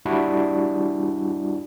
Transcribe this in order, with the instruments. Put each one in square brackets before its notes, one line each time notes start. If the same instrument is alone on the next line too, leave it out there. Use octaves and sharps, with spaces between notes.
[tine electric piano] G3 D4 E4 F#4